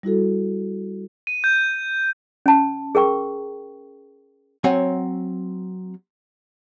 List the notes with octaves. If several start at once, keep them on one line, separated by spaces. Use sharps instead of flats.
G3 E4 F#4 A4
D#7
G6
C#4 A5
G#4 A#4 G5 C#6
F#3 C4 C#5 F#5 G#5